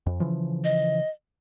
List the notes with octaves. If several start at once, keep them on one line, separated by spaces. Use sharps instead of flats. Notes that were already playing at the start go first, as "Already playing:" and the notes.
F2
C#3 E3 F3
D#5